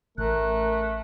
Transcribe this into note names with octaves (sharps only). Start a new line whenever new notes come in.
A1 A3 A#4 F#6